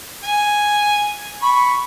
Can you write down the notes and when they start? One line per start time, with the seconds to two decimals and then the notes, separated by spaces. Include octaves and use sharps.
0.23 G#5
1.42 B5 C#6